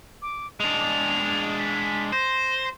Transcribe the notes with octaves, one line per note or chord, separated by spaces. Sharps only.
D6
G#3 D4 F7
B6
C5 A#6